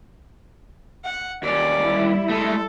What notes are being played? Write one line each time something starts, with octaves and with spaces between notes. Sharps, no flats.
F#5
D#2 C#4 D5
G3 E4
G#3 A3 A4